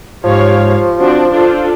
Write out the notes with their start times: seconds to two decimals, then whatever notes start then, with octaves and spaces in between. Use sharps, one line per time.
0.24 G#2 F3 G4 C#5 F5
0.98 C4 D4 F#4
1.31 D4 F4 A4 C5